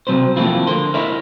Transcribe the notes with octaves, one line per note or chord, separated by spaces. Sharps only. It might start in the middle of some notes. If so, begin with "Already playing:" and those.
C3 F#3 C4 B4 C5
F3 A3 A#3 C4 E4 F4
D3 A#4 C6
E4 A#4 C#5 D#5 E5